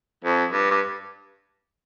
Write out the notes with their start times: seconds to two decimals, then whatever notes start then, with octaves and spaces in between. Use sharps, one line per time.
0.24 F2
0.52 G2
0.71 G2